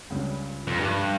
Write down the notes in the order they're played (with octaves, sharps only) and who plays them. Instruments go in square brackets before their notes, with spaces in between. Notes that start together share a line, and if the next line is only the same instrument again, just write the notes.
[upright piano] C#2 C#3 G3 D4
[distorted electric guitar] F2
[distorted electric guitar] G2 [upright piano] F3 A3 D4